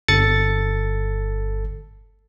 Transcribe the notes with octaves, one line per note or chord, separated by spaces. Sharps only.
G1 A4 A6 C#7